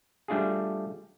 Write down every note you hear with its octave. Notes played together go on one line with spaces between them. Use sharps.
G3 A3 D4 F4 F#4 G#4